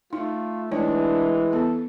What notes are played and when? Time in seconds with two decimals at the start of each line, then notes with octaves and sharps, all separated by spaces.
0.13 A3 D#4 F4
0.72 E3 G#3 A3 D4 D#4 C#5
1.53 B3 A4